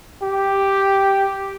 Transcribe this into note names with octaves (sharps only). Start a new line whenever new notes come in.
G4